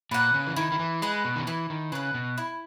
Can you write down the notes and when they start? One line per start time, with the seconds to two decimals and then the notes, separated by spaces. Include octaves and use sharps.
0.11 A#2 B4 F#5
0.34 C#3
0.46 E3
0.56 D#3 E4
0.72 D#3
0.79 E3
1.02 G#3 B4 F#5
1.25 B2
1.36 D#3
1.47 E3 E4
1.70 D#3
1.92 C#3 B4 F#5
2.14 B2
2.38 E4